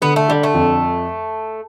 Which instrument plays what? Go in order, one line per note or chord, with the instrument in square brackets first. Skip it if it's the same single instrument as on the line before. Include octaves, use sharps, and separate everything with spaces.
[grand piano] D3 [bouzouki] B3
[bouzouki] A3
[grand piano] D3 [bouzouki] G3
[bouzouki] A3
[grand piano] F2